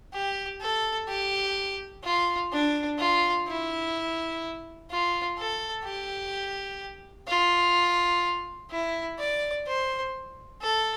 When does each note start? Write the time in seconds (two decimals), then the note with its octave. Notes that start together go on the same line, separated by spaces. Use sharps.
0.13 G4
0.60 A4
1.08 G4
2.03 F4
2.52 D4
2.98 F4
3.47 E4
4.90 F4
5.38 A4
5.84 G4
7.27 F4
8.70 E4
9.19 D5
9.67 C5
10.61 A4